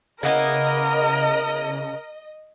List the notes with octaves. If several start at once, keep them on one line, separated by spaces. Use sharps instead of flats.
C#3 A#3 B3 E4 A#4 D#5